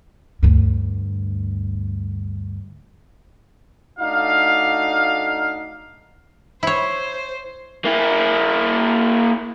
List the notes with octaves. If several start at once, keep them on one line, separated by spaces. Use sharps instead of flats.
D2 G2
A3 D4 D#4 F#4 F5
E4 C5 C#5
A#3 E4